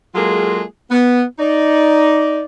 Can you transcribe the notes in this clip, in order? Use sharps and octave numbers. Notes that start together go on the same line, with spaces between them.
F#3 G#3 A#3 F4 G#4 A4
B3
D#4 D5